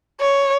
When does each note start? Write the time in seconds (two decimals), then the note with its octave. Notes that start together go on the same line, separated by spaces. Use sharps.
0.20 C#5